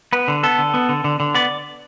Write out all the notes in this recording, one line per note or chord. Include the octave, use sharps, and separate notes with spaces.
B3 B4
D3
B3 A4
D3
B3
D3
D3
D3
B3 D5